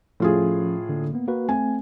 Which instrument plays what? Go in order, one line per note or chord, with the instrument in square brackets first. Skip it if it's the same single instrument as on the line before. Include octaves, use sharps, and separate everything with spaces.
[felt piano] A2 F4 G#4 [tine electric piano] F3 C#4
[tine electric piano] D3 A#3
A#3 B3
A#3 F#4 B4
[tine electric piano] A3 C4 [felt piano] G#5